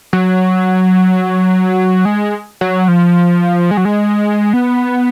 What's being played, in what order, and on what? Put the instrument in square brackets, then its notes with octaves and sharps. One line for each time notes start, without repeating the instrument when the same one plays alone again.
[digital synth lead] F#3
G#3
F#3
F3
G#3
F#3
G#3
B3